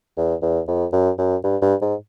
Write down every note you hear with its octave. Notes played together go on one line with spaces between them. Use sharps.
E2
E2
F2
F#2
F#2
G2
G2
G#2